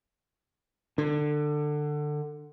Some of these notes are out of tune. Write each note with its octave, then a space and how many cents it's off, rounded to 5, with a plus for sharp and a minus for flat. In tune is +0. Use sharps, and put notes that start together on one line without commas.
D3 +20